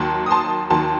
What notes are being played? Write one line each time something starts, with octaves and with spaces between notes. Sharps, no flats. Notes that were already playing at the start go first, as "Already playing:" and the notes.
Already playing: D#2 D#3 F#3 A5 C6
D#6
A5 C6
D#2 D#3 F#3 A5 C6